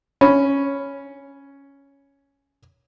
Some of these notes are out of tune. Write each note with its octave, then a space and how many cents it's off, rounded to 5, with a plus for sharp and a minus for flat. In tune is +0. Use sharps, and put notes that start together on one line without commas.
C#4 +0 B5 +0